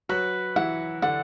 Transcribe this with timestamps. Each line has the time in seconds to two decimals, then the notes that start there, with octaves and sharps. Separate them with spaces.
0.09 F#3 F#4 B4
0.56 E3 E4 F#5
1.02 D3 D4 F#5